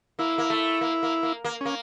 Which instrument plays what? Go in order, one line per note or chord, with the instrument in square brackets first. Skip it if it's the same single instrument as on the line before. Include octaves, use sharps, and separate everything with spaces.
[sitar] A#3 [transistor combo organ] E4
[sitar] A#3
A3
A#3
A#3
A#3
A#3
[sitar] A#3 [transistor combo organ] C#4